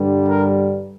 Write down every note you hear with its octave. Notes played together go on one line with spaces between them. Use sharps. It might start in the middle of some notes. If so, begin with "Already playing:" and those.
Already playing: G2 D3 G3
A#4